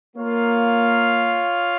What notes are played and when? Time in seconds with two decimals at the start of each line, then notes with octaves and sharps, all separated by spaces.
0.16 A#3 F4 C#5 F5